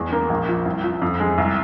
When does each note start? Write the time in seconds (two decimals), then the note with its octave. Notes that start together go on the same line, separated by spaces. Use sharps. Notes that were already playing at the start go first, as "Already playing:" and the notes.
Already playing: E2 G#3
0.12 A#3
0.30 A#1
0.48 F3
0.65 C2
0.84 F3
1.02 F2
1.20 G#3
1.38 C2